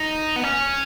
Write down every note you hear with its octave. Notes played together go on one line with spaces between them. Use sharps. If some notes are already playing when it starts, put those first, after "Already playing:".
Already playing: D#4
B3
C#4